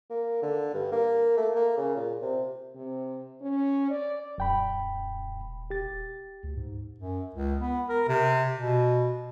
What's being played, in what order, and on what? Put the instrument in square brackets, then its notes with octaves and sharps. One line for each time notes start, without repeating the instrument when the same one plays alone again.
[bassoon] A#3
D3
G2
A#3
A3
A#3
C#3
A#2
C3
[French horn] C3
C#4
D5
[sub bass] D#1 [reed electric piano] F#2 G5 B5
[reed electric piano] G4 A6
[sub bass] D2
G#2
[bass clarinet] F#2
C#2
B3
A#4
C3
B2